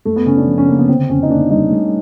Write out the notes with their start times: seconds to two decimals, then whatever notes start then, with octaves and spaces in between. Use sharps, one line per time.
0.05 F#2 A3
0.16 B3
0.26 C#3 C#4
0.37 D4
0.47 F3
0.58 C#4
0.68 C#3 A#3
0.79 B3
0.89 D3 C4
1.09 F2 C#4
1.23 D#4
1.30 A#3 D4
1.50 G3 D#4
1.71 A3